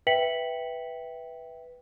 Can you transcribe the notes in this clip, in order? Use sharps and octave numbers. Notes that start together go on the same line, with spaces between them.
B4 E5 G5 B6 C#7 F#7